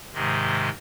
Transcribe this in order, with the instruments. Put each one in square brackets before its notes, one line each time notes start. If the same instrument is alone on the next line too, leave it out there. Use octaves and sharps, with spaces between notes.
[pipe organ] G#2 C3 D#3 G#3